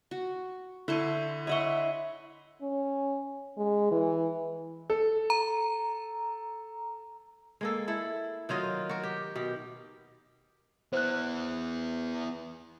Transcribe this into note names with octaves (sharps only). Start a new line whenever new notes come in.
F#4
D3 E4 C5 C#6 D#7
E4 C#5 D#5 E5 F#5 C6 C#6
C#4
G#3
E3
A4
A#5
G#3 A#3 A4
E4 A4
D#3 F#3 F4 D#5
F#4 A#4
G4
B2 G4
B3 E4 C5 F#6